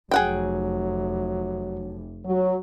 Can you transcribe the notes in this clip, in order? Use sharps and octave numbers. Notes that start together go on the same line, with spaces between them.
F1 F#3 G#4 F#5 G5
F#3